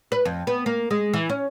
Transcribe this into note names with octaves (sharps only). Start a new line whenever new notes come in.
B4
F2
B3
A#3
G#3
E3
C#4